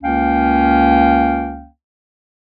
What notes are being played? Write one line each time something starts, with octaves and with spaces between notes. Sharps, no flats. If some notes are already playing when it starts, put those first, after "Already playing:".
C#2 A#3 C#4 F5 G5